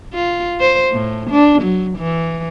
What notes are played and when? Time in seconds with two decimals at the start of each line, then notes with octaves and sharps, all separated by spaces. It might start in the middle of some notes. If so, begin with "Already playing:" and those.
0.14 F4
0.60 C5
0.93 A2
1.31 D4
1.62 F#3
1.98 E3